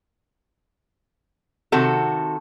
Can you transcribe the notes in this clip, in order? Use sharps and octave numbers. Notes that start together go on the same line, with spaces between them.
C3 D#3 F#4 A4